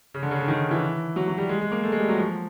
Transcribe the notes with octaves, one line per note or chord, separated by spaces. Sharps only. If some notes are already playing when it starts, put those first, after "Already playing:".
C#3
D3
C#3
D3
D#3
E3
F#3
F#3
G3
G#3
G#3
A#3
A3
G#3
G3
F#3
F3